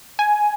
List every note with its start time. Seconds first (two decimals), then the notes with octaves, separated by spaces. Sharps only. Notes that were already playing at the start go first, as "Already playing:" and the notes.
0.19 G#5